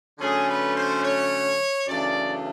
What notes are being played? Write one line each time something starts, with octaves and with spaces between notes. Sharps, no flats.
D3 F#3 A3 C#4 G#4
B4
C5
C#5
F#2 C#3 E3 A3 D4 D5